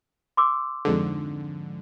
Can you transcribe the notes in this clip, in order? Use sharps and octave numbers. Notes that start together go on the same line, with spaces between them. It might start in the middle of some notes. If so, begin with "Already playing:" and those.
C6 D6 E6
F2 G#2 D3